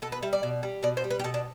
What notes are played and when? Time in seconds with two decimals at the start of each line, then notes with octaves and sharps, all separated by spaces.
0.02 B2 A4
0.12 B4
0.23 G3 E5
0.33 D5
0.43 B2
0.63 G3
0.83 B2 D5
0.97 C5
1.04 G3
1.10 B4
1.19 G4
1.24 B2 A4
1.34 D4